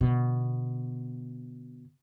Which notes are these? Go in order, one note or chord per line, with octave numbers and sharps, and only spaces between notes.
B2 D3